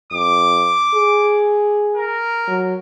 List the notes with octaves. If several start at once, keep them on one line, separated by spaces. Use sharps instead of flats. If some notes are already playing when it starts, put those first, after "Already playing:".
F2 D6
G#4
A#4
F#3